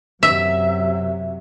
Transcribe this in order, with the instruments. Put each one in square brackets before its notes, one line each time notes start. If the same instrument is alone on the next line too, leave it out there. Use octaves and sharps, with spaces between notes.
[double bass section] F#2 C3 F#3 [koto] E5